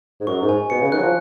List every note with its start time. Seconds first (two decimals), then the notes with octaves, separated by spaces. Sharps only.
0.20 G#2
0.27 F#2 C#6
0.42 G#2
0.49 G#5
0.70 B2 C#7
0.82 C#3
0.92 D#3 F#6
0.97 F#3
1.02 F3